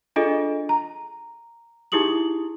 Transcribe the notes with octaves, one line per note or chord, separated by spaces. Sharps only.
D4 F4 G#4 A4 D#5
A#5
D#4 E4 G4 G#4 D#6 F#7